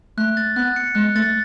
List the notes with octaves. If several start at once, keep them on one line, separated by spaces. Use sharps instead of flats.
A3 F#6
A6
B3 F#6
C#7
G#3 F#6
A3 A6